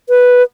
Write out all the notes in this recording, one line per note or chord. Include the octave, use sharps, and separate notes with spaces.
B4